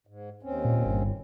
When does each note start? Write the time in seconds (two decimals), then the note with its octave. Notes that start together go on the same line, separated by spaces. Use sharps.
0.07 G#2
0.43 D#2 C4 C#4
0.65 A#2
0.86 G1